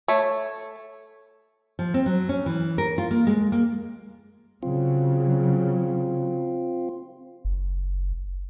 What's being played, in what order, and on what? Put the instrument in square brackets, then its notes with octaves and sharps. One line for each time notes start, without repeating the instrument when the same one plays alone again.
[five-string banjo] A3 C#5
[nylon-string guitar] F3
C4
F#3
C#4
E3
A#4
F4
A#3
G#3
A#3
[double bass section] C#3 F#3 [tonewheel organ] C4 F4
[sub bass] F#1